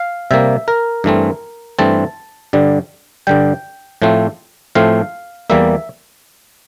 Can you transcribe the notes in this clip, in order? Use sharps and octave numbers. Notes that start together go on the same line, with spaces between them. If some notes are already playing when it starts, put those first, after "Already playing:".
Already playing: F5
C3 G3 A#3 E5
A#4
G2 E3 A3 C4
G2 E3 A3 C4 A5
G2 D3 G3
G2 D3 G3 G5
A2 F3 A3 C4
A2 F3 A3 C4 F5
E2 E3 G3 A#3 E5